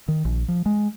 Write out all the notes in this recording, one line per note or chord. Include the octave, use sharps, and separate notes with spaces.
D#3
A#1
F3
G#3